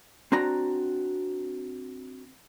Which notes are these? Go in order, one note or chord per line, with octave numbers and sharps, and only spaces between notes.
C4 D4 F#4 A#5